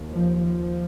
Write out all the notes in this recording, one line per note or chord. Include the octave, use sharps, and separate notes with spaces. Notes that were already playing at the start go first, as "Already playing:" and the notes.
Already playing: D#2
F3
F3